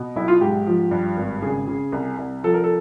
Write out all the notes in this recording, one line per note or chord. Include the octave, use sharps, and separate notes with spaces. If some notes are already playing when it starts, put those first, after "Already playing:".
Already playing: B2
B1 E4
F4
G#2 G4
F3
G2
G#1
C#3 G#4
C#3
C2
C2
F3 A4
A#4
A4